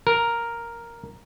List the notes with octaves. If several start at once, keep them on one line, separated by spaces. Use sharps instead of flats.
A#4